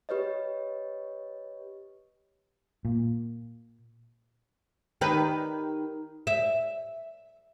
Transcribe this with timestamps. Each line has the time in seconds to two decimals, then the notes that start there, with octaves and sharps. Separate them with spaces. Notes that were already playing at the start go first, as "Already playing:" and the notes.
0.09 G4 B4 C#5 D#5
2.85 A#2
5.01 D#3 G4 B4
6.27 E5